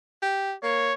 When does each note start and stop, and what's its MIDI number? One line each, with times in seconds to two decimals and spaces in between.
0.23 0.54 67
0.63 0.92 58
0.63 0.94 73